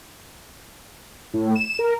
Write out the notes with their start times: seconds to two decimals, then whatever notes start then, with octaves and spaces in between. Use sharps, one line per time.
1.34 A2
1.55 E7
1.79 A#4